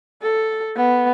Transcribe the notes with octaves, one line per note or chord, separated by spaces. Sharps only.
A4
B3